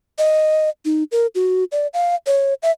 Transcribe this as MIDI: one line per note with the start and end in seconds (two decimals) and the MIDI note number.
0.18 0.69 75
0.85 1.04 63
1.12 1.27 70
1.35 1.64 66
1.72 1.87 74
1.94 2.15 77
2.27 2.54 73
2.63 2.71 76